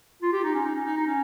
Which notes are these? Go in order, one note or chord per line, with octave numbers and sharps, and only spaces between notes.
F4
G4
D#4
C#4
D#4
C#4
D#4
D#4
C#4